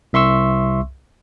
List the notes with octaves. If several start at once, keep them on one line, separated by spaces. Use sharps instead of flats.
C2 E5 C6 C#6 E6